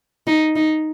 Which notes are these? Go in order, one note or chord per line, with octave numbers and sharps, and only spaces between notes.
D#4
D#4